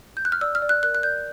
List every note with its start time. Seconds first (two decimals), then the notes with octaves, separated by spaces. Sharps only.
0.17 G6
0.25 F#6
0.32 F6
0.41 D5 E6
0.55 F6
0.62 D5
0.69 F#6
0.83 A#4 F#6
0.95 F#6
1.03 D5 G6